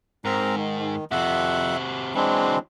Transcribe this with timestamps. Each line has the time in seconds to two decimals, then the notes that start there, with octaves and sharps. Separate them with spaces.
0.25 G#2 C4 A#4 A#5
0.56 D#3
1.12 F2 C3 F#4 E5 F#5
2.15 E3 F#3 G#3 C4 D4